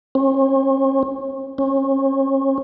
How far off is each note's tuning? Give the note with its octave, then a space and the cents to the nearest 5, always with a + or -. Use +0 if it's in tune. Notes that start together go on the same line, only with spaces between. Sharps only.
C#4 -45
C#4 -35